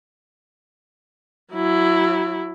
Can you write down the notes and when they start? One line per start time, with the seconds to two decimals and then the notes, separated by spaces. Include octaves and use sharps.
1.53 F#3 E4